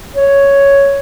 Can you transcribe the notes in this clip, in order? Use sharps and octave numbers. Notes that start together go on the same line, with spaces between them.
C#5